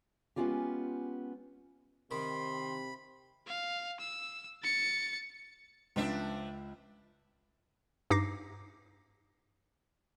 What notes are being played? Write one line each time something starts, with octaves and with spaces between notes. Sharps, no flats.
G#3 A3 B3 C#4 F4 G4
C3 D#3 B5 C6
F5
E6
A6 C#7
C#2 F3 D4 E5
G2 D#4 D6 A#6 C7